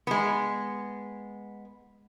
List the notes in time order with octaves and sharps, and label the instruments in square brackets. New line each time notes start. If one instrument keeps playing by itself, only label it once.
[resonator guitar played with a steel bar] G#3 B3